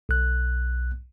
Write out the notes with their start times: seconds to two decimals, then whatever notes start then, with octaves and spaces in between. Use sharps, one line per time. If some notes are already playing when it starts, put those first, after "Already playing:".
0.09 B1 F#6